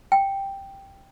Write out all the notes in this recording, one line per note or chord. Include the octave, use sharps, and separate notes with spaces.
G5